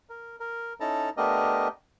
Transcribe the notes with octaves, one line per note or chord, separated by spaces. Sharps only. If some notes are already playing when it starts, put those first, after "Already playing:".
A#4
A#4
C#4 D#4 E4 A4 A5 A#5
A3 B3 D4 G4 A#4 D#5